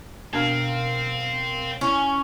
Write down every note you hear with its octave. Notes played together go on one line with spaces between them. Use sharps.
B2 C4 D4 A#4 F5
C#4 E4